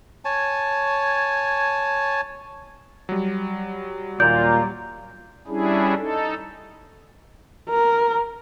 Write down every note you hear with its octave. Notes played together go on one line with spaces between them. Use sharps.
C#5 G#5 A5
F#3 G3
D#2 A#2 F4 D5 A#5 G6
G3 C#4 D4 E4 G#4
D#4 A4
A#4